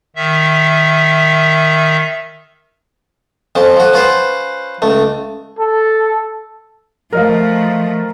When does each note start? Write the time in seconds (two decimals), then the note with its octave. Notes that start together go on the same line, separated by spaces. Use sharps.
0.16 D#3 E5
3.55 F2 F3 C#4
3.76 F3 F#4
3.93 C#4 F4 B4 C5
4.82 C#2 A3
5.59 A4
7.13 F3 A3 A#4 D#5 F5